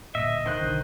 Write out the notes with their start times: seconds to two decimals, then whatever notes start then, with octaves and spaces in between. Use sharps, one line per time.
0.15 D1 A#2 D#5 E5
0.46 D#3 C5 F#6
0.61 B1 D3 C#4